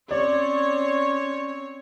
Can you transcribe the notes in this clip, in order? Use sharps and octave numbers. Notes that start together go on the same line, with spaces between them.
C4 C#4 C#5 D5